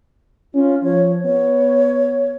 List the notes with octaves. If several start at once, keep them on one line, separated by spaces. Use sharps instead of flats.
C#4 F4
F3 C#5
B3 C#5